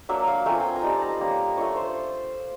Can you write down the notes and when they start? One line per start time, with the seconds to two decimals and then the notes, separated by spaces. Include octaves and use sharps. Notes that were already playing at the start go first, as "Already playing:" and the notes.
0.09 F#3 A#3 D4 E5
0.27 F5
0.46 A3 C4 F4 G#5
0.60 G5 G#5
0.76 A#5
0.83 G3 C4 D#4 A5
1.01 A#5
1.21 G3 A#3 C#4 F5
1.57 A3 D4 F4 C#5
1.76 C5